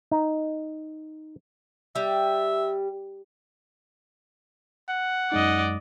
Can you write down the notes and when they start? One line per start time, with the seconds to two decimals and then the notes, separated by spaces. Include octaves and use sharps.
0.11 D#4
1.96 G3 E5
4.89 F#5
5.32 F#2 G#3 D#4 D5 D#5